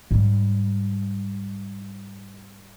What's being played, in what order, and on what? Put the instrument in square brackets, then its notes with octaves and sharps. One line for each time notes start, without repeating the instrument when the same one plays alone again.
[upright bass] G#2 G3